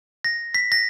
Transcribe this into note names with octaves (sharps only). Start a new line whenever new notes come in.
A#6
B6
A#6